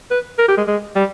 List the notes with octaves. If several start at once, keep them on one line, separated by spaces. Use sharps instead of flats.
B4
A#4
G4
G#3
G#3
G3